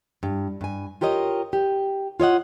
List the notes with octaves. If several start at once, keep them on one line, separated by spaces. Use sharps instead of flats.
G2
G2 G#5
F4 G4 A#4 C#5 D#5
G4
F4 C#5 D#5 F#5